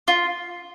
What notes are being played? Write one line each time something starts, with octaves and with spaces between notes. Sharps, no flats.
F4